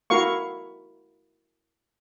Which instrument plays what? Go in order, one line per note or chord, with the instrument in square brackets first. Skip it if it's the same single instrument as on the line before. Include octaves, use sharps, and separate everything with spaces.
[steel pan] E4 F#4 A#4 F5 C#6